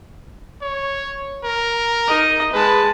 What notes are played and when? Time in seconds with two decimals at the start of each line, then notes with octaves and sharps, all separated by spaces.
0.62 C#5
1.44 A#4
2.07 D#4 D#5
2.53 G#3 B4 A5